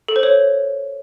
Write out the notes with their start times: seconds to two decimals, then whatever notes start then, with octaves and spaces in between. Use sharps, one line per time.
0.08 A4
0.16 C5
0.23 C#5